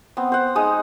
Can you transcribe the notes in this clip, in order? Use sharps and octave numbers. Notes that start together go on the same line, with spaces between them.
B3 C4
C5 F#5
G#3 D#4 D#6